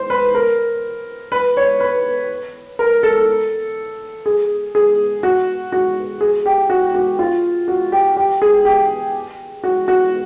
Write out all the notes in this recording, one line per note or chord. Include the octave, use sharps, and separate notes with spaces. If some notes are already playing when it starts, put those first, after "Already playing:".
Already playing: C5
B4
A#4
B4
C#5
B4
A#4
A4
G#4
G#4
F#4
F#4
G#4
G4
F#4
F#4
F4
F#4
G4
G4
G#4
G4
F#4
F#4